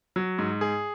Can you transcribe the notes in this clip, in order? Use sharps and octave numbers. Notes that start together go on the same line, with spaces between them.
F#3
G#2
G#4